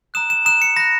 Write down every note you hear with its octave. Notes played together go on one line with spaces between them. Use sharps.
A#5 D#6 F#6 E7
E7
A#5 D#6 F#6 E7
C#7
B5 F#6 A#6